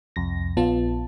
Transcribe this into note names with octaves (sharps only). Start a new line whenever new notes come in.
C2 F2 A#6
A#1 B3 F4 A5